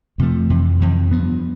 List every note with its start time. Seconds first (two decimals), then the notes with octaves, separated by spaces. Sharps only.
0.18 F2 C3 F3 A3
0.50 F2 C3 E3
0.80 F2 C3 E3
1.11 G2 F3 B3